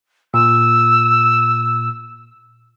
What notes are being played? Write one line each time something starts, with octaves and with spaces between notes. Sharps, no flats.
A#2 E6